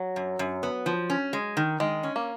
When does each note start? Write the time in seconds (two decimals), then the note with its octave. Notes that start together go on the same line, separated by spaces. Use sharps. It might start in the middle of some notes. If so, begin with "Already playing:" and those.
Already playing: F#3
0.16 F#2
0.39 F#2
0.63 B3
0.86 F3
1.10 C#4
1.33 G#3
1.57 D#3
1.80 D#3 G#3
2.03 C#4
2.16 A#3